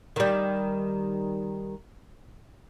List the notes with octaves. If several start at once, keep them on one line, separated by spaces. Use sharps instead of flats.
D#3 G3